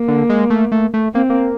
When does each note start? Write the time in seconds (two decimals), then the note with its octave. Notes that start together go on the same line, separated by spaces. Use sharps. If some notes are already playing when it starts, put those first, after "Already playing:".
Already playing: A#3
0.08 D3
0.29 G#3
0.50 A3
0.72 A3
0.94 A3
1.15 A#3 C4
1.30 A#3